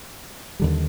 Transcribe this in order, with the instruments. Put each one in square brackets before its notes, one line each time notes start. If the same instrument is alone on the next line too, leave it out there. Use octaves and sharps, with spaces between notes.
[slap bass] D#2 D3 G3